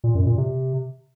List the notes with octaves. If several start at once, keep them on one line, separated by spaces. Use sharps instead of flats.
A#2
F#2
A#2
C3